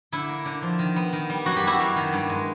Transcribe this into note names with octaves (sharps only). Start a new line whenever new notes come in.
D3 E4
A#3
D3
F3
D#3
B3
D#3
G3
F#2 F#4
G4
G3 E4 F#4
F#2
D#3
G2
G#3